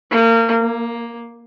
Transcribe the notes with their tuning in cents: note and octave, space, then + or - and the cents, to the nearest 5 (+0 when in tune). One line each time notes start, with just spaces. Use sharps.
A#3 -30
A#3 +10